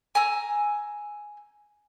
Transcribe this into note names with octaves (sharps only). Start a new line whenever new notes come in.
G#5 A#5 E6